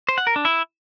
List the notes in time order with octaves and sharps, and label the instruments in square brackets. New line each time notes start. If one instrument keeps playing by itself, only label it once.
[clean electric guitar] C5
F#5
A#4
D4
E4